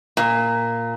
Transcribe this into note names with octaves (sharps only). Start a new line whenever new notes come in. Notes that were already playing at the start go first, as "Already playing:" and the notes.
A#2